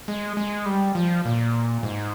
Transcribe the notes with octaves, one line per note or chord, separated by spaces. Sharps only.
G#3
G#3
G3
F3
A#2
G#2